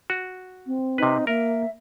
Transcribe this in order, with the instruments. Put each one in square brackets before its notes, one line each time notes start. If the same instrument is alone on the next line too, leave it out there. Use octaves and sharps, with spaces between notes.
[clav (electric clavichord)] F#4
[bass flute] C4
[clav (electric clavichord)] C3 B4 [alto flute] D#4
[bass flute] A#3 [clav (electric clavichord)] A#4 [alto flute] E5